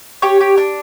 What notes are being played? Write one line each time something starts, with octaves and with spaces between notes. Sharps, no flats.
G4 C#5
G4
D4